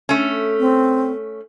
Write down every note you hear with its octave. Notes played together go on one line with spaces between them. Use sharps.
A3 C#4
C4